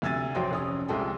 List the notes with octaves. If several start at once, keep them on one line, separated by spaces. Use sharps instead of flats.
D2 C3 E6 G#6 A6 D#7
A1 F#3 C5 C#5 G5 C6
F1 C#4 D#6
C2 F3 G#3 A4 G5 C6